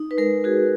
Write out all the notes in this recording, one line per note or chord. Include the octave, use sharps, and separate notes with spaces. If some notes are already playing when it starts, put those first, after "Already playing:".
Already playing: D#4
B4
G#3 A#4
F#4 G#4